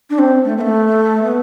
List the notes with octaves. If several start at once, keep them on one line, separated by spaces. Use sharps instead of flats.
D4
C4
A3
B3
A3
B3